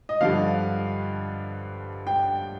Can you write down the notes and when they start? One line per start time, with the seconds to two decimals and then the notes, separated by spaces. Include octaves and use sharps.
0.09 D#5
0.21 G2 D3 F3 F5
2.07 G5